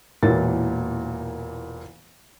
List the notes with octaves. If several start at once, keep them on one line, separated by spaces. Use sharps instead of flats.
E1 A#2 E3 A#3 A6